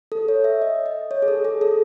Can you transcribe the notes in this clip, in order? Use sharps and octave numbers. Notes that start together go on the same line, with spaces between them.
A4
C#5
E5
D#5
D#5
C#5
G#4
A4
G#4
A4